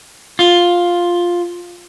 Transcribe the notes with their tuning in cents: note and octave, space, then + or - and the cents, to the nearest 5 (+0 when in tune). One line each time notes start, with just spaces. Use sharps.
F4 +5